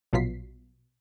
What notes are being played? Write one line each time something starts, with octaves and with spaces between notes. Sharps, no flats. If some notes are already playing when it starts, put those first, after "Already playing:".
A#1 B2 F#3 F4 B6 C7